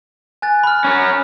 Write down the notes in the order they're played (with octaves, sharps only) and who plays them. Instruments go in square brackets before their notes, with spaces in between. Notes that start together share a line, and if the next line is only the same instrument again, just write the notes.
[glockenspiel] G#5 F#6 A6
B5 F6
[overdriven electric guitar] C#4 A#4